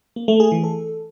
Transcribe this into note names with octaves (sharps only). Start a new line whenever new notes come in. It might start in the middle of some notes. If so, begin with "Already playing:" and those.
A#3
A3
G#4
E3
A4